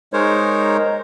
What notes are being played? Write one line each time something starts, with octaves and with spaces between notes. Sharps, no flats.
G#3 D#4 A#4 C5 C#5